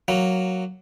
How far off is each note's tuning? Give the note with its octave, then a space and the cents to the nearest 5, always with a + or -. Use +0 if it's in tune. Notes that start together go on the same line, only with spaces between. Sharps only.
F#3 +0 A#3 +0